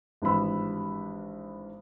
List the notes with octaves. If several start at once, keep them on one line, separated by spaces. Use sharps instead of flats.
G#1 G2 E3 B3 B5 E6